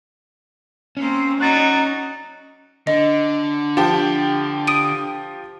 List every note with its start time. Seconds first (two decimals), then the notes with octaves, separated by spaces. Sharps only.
0.97 A#3 C4 C#4
1.40 F#3 D#4 F#4 D5 F#6 A6
2.87 D3 D#5
3.77 F3 G4 A5
4.67 D#6 D7 D#7